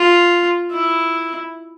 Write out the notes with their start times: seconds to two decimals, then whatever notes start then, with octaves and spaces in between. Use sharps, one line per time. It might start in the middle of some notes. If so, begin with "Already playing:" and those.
Already playing: F4
0.72 E4